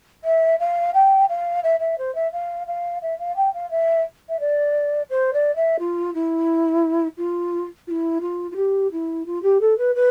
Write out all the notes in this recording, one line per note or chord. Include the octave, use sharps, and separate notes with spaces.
E5
F5
G5
F5
E5
E5
C5
E5
F5
F5
E5
F5
G5
F5
E5
E5
D5
C5
D5
E5
F4
E4
F4
F4
E4
F4
F4
G4
E4
F4
G4
A4
B4
B4